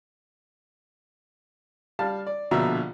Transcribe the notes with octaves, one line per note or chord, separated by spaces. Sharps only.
G3 F5 A5
D5
A#1 B2 D3 E5 A#5